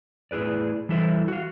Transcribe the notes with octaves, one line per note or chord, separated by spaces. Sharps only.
A2 E4 G#4 B4 D5
E3 G3 E4 A4 C5 E5
F#4 F5